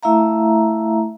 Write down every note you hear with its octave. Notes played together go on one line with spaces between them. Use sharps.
A3 E4 E5 F5 A#5